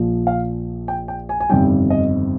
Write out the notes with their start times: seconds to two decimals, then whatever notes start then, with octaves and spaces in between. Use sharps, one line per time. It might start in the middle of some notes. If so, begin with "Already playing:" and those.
Already playing: A#1 A#2 F3
0.27 F5
0.88 G5
1.08 G5
1.29 G#5
1.40 G#5
1.49 G1 F2 C3 D#3 G3 G5
1.90 D#5